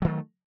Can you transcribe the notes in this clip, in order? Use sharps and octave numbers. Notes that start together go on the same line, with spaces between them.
D#3 F#3 A3